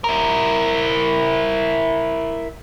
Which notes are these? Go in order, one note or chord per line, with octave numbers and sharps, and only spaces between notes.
E4 A#4